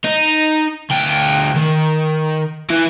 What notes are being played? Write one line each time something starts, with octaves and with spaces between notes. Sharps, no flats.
D#4
D2 G5
D#3
E3 E4